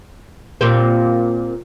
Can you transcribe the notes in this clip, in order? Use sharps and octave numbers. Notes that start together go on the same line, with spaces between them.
A#2 G3 C4